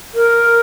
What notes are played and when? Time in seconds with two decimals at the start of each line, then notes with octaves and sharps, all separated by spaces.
0.14 A#4